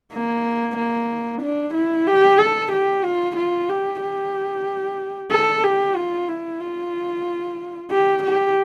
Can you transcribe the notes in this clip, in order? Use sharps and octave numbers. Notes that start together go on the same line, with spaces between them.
A#3
A#3
D4
E4
G4
A4
G4
F4
F4
G4
G4
A4
G4
F4
E4
F4
G4
G4